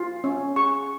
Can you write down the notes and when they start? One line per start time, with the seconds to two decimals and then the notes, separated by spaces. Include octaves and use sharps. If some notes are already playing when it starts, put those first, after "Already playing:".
Already playing: F4
0.24 C#4
0.56 G#4 C#6